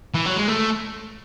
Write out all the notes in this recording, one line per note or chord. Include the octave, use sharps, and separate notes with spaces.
E3
F#3
G#3
A3